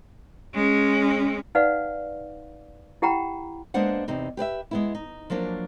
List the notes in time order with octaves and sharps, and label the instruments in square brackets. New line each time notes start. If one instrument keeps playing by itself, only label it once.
[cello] G#3 C#4
[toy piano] D#4 B4 D5 F5 F#5
E4 G4 F#5 G5 A#5 B5
[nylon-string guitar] G#3 A#3 B3 D4 C5 F#5
E2 C3 D#4
G4 B4 D5 E5
G#3 B3 E4
D#4
F3 F#3 A#3 D4